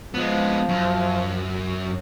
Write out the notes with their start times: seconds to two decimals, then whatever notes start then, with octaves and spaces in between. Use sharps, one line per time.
0.14 F3 G#3 B3
0.69 F#2